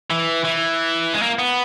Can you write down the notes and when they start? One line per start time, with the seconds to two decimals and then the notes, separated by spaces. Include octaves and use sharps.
0.11 E3
0.45 E3
1.13 G#3
1.22 A#3
1.39 B3